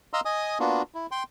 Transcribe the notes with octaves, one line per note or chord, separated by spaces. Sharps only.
D#5 F5 A#5 C6 E6
D#5 G#5 D#6
A#3 B3 D4 F4 F#4
E4
G5 C6